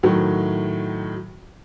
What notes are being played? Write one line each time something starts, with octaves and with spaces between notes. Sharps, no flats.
A2 D#3 F#3